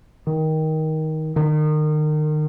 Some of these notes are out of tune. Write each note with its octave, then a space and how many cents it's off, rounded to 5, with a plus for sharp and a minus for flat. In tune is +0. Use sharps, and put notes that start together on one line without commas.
D#3 +15
D#3 -30